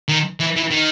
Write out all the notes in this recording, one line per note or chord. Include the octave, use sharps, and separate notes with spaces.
D#3
E3
E3
D#3